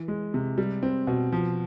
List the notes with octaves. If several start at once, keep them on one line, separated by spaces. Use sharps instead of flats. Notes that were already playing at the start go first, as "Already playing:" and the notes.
Already playing: E3
G#3
C3
G3
C4
B2
F3